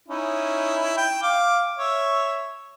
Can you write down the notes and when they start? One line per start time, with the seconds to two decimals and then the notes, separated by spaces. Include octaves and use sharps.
0.08 C#4 D#4 E4
0.97 G5
1.22 F5 D6
1.78 C#5 E5